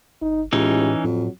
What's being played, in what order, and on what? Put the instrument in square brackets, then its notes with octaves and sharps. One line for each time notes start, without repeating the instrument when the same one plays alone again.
[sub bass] G1 [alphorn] D#4
[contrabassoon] C#2 [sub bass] A2 [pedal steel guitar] E3 C#4 D#4 [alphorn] G4
[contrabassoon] F2 [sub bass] A2 [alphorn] F#3